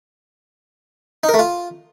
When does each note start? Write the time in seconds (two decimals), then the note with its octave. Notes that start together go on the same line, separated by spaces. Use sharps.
1.24 D#4
1.29 A#4
1.34 A3
1.39 F4